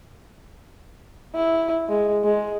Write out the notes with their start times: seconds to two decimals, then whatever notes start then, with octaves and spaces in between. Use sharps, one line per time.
1.35 E4
1.89 G#3
2.24 G#3